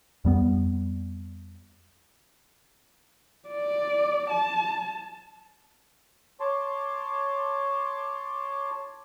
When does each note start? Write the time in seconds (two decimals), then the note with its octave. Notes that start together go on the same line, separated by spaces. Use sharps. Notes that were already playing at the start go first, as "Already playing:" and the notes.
0.25 F2 G3 B3
3.48 D5
4.30 A5
6.40 C#5 A5 C6 D6